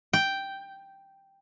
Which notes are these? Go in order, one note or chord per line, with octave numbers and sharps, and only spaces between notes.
G5